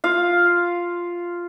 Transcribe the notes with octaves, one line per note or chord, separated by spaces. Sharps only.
F4 F5